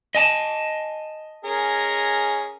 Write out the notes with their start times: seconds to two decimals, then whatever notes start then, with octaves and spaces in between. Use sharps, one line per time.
0.15 D#5 G#5 A5
1.45 C#4 G#4 A#4